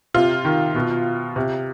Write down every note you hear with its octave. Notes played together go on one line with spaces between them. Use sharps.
C3 F4
D#3
B2
C3